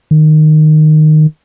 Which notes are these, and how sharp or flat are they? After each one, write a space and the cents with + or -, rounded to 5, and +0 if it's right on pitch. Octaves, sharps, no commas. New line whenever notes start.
D#3 -15